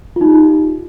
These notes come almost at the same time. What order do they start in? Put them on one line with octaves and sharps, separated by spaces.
F4 D#4 G4